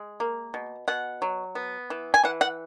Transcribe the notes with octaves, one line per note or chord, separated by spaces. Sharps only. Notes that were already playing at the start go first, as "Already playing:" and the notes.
Already playing: G#3
A#3
B2
B2 F#5
F#3
B3
E3
G#5
E3 F#5
F#5